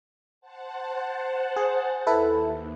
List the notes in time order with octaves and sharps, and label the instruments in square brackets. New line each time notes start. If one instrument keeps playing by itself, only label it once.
[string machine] C5 F#5 A5
[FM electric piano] G#4
[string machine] D#2 [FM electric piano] E4 A4 B4